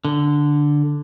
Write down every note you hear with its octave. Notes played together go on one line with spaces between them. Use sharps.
D3